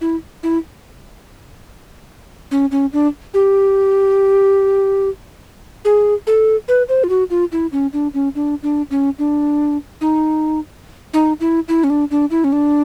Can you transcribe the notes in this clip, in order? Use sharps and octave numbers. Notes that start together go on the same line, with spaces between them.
E4
E4
C#4
C#4
D4
G4
G#4
A4
B4
C5
F4
F#4
F4
E4
C#4
D4
C#4
D4
D4
C#4
D4
D#4
D#4
E4
E4
C#4
D4
D4
E4
C#4
D4